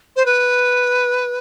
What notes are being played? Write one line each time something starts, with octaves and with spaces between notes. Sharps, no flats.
C5
B4